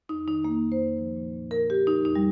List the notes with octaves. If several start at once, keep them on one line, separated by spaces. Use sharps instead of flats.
F2 D#4
D#3 D#4
F2 A#3
F2
C5
F2
F3
A#2
A#2
A#2 A#4
A#2 G4
F3 D#4
F2 D#4
G3